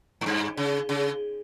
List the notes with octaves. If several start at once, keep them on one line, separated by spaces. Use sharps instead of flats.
G#2
G2
C#3
C#3